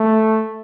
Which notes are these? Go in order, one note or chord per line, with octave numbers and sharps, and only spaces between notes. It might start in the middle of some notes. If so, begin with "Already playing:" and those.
Already playing: A3